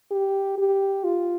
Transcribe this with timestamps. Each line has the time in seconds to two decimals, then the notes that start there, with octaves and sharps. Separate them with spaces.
0.11 G4
0.58 G4
1.04 F4